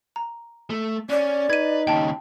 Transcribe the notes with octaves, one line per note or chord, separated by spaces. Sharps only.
A#5
A3
C#4 D5
D#4 B4 G#6 D#7
D#2 C#3 G5 A5